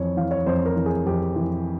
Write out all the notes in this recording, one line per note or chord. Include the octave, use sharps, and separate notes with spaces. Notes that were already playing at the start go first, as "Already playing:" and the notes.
Already playing: F2 E3 C#5
E3 F5
C#5
F2 C5
A#4
E3
G#4
F2 G4
E3